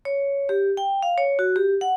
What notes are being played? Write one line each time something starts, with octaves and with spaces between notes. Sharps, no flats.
C#5
G4
G5
F5
C#5
F#4
G4
F#5